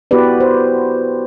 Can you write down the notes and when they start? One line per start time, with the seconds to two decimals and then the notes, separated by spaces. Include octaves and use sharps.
0.11 B3 E4 F#4 G4 B4 D5
0.40 C5